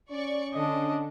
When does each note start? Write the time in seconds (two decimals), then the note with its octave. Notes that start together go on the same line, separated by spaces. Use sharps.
0.11 C#4 D5 C#6
0.54 D3 D4 D#5